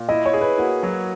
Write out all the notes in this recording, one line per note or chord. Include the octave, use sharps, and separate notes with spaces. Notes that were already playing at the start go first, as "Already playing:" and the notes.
Already playing: A#2
E4 D#5
C#5
G#4
B4
A#3 F#4
F#3